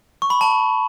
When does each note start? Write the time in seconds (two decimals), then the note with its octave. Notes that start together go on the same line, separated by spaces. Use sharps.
0.22 C#6
0.30 B5
0.41 A5